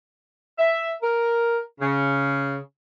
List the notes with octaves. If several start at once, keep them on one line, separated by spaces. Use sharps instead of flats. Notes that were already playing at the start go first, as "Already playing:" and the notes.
E5
A#4
C#3